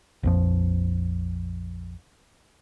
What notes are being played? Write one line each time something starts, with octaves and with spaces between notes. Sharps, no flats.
A#1 F2 F3